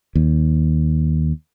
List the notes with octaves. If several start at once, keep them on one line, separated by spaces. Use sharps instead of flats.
D#2